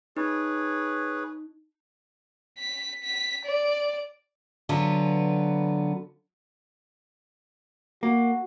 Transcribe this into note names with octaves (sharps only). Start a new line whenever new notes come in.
D#4 G#4 B4 C#5
B6
B6
D5
D3 F#3 B3 F4 B4
A#3 F#4